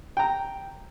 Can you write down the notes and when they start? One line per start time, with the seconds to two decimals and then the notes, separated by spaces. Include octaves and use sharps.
0.17 G5 A#5